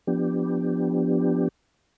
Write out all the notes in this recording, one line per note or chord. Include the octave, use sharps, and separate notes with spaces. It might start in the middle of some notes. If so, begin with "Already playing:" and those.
F3 B3 D4 G4